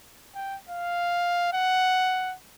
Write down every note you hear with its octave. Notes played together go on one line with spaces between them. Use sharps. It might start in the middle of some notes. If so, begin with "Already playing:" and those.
G5
F5
F#5